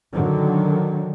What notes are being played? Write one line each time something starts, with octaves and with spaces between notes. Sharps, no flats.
D3 D#3 F#3